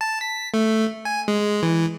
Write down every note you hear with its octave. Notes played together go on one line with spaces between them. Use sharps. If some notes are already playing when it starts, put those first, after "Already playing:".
A5
B6
A3
G#5
G#3
E3